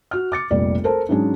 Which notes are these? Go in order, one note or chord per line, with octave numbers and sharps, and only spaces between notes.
F#4 F6
D6 A6 C#7
F1 A#1 G3 D5
A4 A#4 C5 A5
G#2 F#3 G#3 C#4 D4